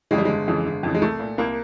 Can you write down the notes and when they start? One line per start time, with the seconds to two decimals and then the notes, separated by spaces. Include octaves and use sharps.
0.11 F2 C#3 E3 G#3
0.18 G3
0.25 G1 G#3
0.48 F2 C#3 E3
0.66 G1
0.83 F2 C#3 E3
0.94 G#3
1.01 C2 A3
1.20 A#2
1.38 C2 A#3